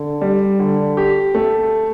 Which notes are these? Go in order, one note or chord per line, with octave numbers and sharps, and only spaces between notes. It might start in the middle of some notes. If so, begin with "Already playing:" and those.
Already playing: D3
G3
D3
G4
A3